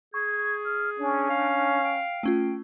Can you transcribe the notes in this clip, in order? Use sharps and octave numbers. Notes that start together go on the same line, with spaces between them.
G#4 C#6 G#6
F6
C#4 D4
F5
G5
A3 C#4 F4